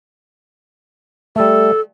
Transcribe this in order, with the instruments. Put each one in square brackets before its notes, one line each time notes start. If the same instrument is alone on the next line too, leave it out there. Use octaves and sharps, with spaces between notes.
[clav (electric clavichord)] G3 A3 [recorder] A4